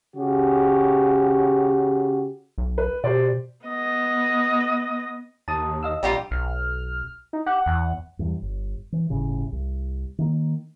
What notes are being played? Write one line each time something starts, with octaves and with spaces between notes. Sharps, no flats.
C#3 F#4 G4
B1
B4
B2 G4 C5 D5
B3 D#5
D#2 A5 D#6
D#5 F5 E6
A#1 G3 F4 G4 A#5
B1 F6
D#4
G4 F#5
E2
E2 G2
G1
E3
G1 A2 C#3
C2
D#3 A#3